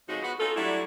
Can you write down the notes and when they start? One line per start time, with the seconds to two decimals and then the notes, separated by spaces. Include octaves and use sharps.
0.07 F2 C#3 G#3 D#4 F#4
0.21 B3 F#4
0.38 C#4 D#4 F4 A4
0.55 F#3 G3 A3 D4 E4